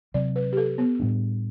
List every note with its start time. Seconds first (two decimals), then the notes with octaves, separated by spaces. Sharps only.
0.14 C3 F#3 C4 D5
0.36 B4
0.53 G4
0.57 A4
0.78 B3
1.00 A2 G3 D4